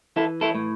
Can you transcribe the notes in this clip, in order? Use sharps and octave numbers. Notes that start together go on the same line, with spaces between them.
E3 E4 A4
E4 A4
A2